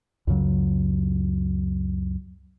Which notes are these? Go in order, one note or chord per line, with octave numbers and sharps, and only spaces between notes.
C#2 F#2 C#3 F#3